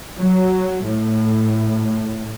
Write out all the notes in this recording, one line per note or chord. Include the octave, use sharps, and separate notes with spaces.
F#3
A2